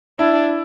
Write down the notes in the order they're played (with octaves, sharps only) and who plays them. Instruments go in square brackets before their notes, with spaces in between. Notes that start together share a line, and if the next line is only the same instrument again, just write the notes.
[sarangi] D4 [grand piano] E4